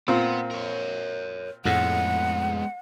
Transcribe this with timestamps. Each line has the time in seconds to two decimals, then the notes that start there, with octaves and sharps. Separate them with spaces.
0.08 A#2 B3 C4
0.51 A#4 C#5
1.65 F2 A2 G#3 B3 F#5